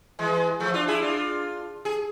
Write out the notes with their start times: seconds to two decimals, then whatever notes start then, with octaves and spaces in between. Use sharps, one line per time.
0.19 E3 G#3
0.60 F3 A3
0.74 D4 F4
0.88 E4 G#4
1.02 D4 F4
1.85 G#4